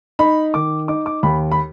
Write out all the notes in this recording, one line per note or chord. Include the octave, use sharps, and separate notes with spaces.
D#4 B5
D#3 D6
D#4 D6
D6
D#2 B5
B5